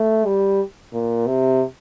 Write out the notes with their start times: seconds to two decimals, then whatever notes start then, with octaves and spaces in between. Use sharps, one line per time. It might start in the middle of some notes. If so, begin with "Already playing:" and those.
Already playing: A3
0.26 G3
0.93 A#2
1.27 C3